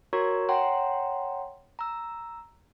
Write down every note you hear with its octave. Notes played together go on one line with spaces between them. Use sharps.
F#4 A#4 C#5 A#5 C#6 G#6
C#5 F#5 G5 A#5 C6
A#5 E6